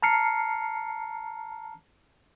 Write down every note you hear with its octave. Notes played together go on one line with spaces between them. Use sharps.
A5 A#5 F6 C7 C#7